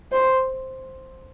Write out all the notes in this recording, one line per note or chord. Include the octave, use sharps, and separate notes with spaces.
C5